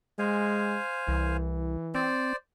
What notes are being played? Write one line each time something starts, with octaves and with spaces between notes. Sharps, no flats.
G#3 C5 F5 G#5
C2 E3
C4 C5 D5